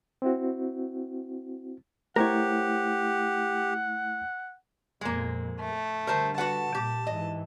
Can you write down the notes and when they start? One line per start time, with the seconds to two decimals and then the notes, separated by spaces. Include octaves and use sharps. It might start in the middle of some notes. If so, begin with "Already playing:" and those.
0.22 C4 E4 F#4
2.16 A3 E4 G4 A#4 C5 C#5 F#5
5.01 F2 A#2 G#3 A#3
5.60 A3
6.07 D3 G3 A#4 C5 A5
6.38 F#4 B4 F#5 A5
6.75 A#2 G4
7.07 G#2 E3 D#5